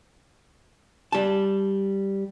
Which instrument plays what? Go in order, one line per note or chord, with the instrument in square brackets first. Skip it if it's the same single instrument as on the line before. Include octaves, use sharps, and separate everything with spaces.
[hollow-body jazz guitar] G3 A5